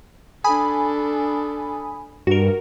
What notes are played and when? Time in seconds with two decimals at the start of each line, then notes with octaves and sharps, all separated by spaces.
0.44 D4 A4 G#5 B5 D#6
2.27 G2 F#4 A#4